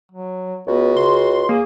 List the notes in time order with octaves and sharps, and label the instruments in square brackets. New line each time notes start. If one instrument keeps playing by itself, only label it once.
[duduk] F#3
[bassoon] C#2 [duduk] B3 [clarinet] F#4
[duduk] C#3 [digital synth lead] C6
[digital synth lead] A#3 [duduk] G#4